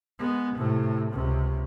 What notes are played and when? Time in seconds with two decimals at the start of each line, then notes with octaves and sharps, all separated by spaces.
0.19 G#3 B3
0.55 A2 C3
1.11 C#2 C3